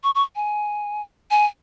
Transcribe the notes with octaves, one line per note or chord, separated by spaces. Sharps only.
C#6
C#6
G#5
G#5